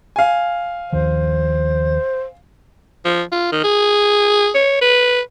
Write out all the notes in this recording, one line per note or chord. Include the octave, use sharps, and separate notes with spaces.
F5 G#5
D#2 D#3 F3 C5
F3
F4
D#3
G#4
C#5
B4